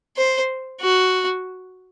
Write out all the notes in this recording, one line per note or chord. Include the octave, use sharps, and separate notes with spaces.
C5
F#4